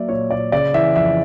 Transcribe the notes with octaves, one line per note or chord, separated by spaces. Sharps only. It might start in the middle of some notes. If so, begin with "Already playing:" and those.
Already playing: F#3 A#3 D5 E5
A#2 C#5
A#2 D5
C#3 D5
E3 E5
F2 E5